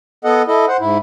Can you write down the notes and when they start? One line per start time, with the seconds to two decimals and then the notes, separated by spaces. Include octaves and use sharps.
0.25 B3 A4 D#5 F#5
0.47 E4 A4 D#5
0.68 C5 F#5
0.80 G#2 E4